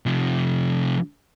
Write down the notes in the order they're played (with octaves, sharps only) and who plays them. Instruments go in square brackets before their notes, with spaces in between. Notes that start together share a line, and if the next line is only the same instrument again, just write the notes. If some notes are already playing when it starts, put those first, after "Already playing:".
[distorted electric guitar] C3 F3